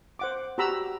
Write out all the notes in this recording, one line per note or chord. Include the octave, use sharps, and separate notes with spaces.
C5 F#5 D6
F#4 G4 A#5 B5 E6